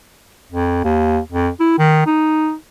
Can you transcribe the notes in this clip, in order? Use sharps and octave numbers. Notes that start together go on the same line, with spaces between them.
F2
D#2
F2
E4
D#3
D#4